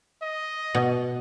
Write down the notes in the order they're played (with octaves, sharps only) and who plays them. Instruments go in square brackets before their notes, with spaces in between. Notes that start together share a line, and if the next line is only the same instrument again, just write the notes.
[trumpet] D#5
[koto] B2